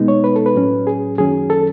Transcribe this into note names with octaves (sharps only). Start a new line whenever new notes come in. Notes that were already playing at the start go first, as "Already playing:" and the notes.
Already playing: B2 G#3 B3 D#4
C#5
B4
A4
B4
A2 F#3 C#4
G#4
F#2 D#3 F#3 C#4 G#4
A4